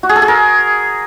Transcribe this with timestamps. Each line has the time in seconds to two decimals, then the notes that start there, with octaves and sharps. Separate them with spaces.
0.03 F#4
0.09 G#4
0.16 A4
0.22 G#4
0.28 A#4